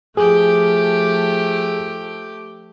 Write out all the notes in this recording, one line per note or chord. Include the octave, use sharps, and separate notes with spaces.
F3 A3 G4 G#4